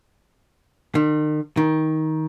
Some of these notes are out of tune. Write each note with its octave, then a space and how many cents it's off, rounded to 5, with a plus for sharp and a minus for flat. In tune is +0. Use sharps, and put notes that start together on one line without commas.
D#3 -40
D#3 +15